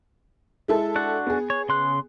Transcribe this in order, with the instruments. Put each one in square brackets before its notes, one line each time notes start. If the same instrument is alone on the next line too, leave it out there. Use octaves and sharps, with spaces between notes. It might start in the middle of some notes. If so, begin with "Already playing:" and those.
[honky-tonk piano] G#3 E4 A4
[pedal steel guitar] D4 F#4 F#5
[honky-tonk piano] B3 G#4
[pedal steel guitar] C#5
C#3 C6 F#6